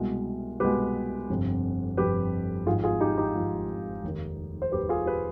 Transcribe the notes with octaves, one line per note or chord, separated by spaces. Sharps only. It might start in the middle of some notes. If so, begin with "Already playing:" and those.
Already playing: C2 B2 G#3
C2 B2 G#3 G4 B4
G1 F2 C3
G1 F2 C3 G4 B4
G#1 G#2 F3 F4 G#4
F4 G#4
D#4 G4
D#4 G4
G#1 G#2 F3
F1 D#2 D#3
C5
F1 D#2 D#3 G4 B4
F4 G#4
G4 B4